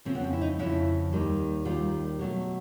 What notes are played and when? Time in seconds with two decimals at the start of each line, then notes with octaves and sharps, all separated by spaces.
0.05 F2 C#3 F3 C4
0.15 B3
0.24 C4
0.33 E4
0.41 D#4
0.59 F2 C#3 F3 E4
1.13 D#2 D#3 G3
1.65 D#2 D#3 G3 F4
2.19 B2 F#3 A3